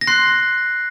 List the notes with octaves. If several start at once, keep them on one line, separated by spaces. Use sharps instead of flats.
A#6
C6 F#6 C7